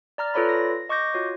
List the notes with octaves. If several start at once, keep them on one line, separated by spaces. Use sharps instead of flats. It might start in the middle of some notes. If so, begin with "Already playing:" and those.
D5 A#5 F6 A6
F4 A4 B4 C#5 D5 B5
A#6
D#5 C#6 D6 G6 A#6
F4 F#4 C#5